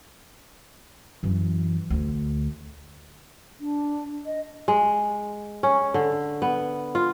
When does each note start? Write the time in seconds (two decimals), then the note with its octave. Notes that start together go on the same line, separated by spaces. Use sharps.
1.23 F#2 E3
1.90 D2
3.60 D4
4.26 D#5
4.68 G#3
5.63 C#4
5.94 D3
6.42 B3
6.95 F4